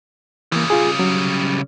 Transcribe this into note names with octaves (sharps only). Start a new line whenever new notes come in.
C#3 E3 G3 A#3
F4 G#4
F#3 C#4